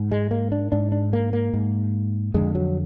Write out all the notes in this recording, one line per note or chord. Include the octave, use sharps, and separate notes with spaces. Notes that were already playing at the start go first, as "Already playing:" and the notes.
Already playing: G#2
G#3
A#3
D4
G#2 D4
D4
A#3
A#3
G#2
F2 D3 G#3
F#3